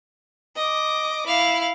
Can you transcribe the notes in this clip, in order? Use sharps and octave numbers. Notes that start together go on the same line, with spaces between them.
D#5 D6
E4 F5